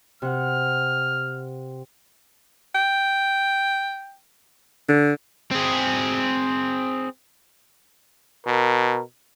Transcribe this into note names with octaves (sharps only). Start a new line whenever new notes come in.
C3 F#5 F6
G5
D3
C4 G#4
B2 A#4